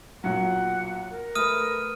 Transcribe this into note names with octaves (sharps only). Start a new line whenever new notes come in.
B1 A#2 F#3 F#5
A#4
A3 B4 D#6 F6 D#7